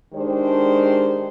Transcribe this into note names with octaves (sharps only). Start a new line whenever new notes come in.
D#3 G#3 D4 G4 C5